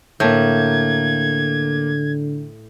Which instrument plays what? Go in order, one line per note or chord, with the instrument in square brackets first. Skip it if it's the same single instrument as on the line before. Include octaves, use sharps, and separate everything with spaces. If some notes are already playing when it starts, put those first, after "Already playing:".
[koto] A2 [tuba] D3 [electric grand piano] A#3 G6 [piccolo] G#6